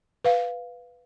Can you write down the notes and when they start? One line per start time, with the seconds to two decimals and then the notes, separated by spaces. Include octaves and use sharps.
0.24 B4 F5